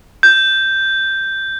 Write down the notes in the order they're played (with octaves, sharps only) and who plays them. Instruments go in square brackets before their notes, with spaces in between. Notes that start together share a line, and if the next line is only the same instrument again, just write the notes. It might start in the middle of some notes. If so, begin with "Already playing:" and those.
[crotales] G6